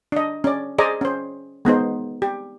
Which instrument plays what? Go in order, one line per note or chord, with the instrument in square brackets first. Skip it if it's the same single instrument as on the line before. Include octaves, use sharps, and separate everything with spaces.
[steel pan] D4 D#5
C#4 D5
G#4 C5 D5 D#5 G#5 A#5
C#4 C5
G#3 B3 D#4 C5
G4